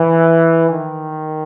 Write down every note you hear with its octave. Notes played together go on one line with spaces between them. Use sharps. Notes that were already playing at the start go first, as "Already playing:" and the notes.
Already playing: E3
D#3